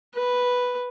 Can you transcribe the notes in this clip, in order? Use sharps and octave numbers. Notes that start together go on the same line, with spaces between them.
B4